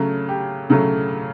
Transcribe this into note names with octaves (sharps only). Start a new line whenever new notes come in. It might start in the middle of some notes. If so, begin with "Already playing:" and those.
Already playing: C#3 F#3 A3
G4
C#3 F#3 A3